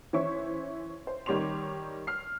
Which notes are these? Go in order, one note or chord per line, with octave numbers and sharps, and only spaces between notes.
E3 C#4 C5 E5 C#6
C5
D#3 G3 G4 C#5 C6 F7
F6 C7